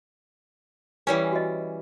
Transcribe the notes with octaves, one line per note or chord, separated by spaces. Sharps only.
E3 G3 C#4 C#5 G#5
F#4 D#5